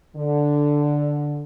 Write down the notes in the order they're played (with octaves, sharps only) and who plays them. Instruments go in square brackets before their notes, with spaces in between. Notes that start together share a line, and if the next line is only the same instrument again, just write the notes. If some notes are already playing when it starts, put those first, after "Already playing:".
[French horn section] D3